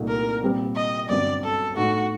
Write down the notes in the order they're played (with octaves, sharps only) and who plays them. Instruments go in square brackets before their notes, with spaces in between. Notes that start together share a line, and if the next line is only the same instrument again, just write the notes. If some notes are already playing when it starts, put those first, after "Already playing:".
Already playing: [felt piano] C2 A#2 A3 D#4
[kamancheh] A#4
[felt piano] A#2 G3 C4 G4
[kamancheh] D#5
[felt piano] G1 F#2 F#3 C4 [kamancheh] D5
[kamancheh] A4
[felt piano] A2 A3 D#4 A4 [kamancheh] F#4